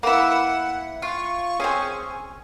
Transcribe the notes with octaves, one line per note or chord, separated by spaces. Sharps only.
A#3 E4 B4 F#5
F4 C#6
C4 C#4 G#4 G#5